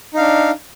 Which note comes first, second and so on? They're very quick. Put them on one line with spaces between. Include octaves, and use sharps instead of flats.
D#4 F5 D4